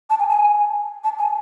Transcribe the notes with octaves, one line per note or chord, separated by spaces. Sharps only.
A5
G#5
G#5
A5
G#5